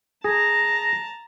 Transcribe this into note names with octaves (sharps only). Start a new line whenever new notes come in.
G#4 A5 A#5 A#6